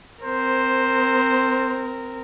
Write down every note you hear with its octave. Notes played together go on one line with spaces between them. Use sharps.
C4 A#4 C5